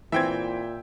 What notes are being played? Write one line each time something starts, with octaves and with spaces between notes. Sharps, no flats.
A#2 E3 C4 E5 G5 G#6